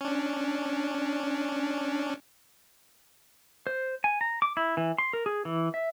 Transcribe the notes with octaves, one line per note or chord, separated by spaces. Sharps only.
C#4 D4
C5
G#5
A#5
D6
E4
E3
C6
A#4
G#4
E3
E5